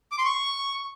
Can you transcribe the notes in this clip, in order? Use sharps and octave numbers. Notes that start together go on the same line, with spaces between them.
D6
C6
C#6